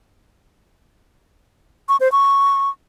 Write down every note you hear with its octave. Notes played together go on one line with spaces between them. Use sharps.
C#6
C5
C#6